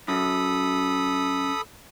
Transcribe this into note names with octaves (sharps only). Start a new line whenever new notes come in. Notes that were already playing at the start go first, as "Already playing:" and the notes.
F#2 A4 B5 D#6